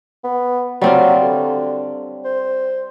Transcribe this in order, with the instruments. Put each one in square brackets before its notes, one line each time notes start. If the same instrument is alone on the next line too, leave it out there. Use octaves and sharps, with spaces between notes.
[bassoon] B3
[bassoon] F#3 [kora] G3 C4 F4
[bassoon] D3
C5